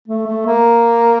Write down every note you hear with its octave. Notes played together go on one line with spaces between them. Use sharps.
A3
A3
A#3